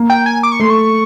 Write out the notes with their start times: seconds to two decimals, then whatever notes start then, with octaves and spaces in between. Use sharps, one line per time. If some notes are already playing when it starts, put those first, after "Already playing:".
Already playing: A#3
0.10 G5
0.26 G#5
0.43 D6
0.52 C#6
0.60 A3 C6
0.70 C#6